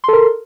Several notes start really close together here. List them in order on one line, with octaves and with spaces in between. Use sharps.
C6 A4 A#4